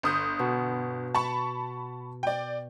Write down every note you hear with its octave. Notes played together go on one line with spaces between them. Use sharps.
G1 D#6 G6
B2
A5 B5 C#6
D5 G5